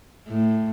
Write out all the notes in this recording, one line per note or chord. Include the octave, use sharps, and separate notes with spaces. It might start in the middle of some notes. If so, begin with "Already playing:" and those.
A2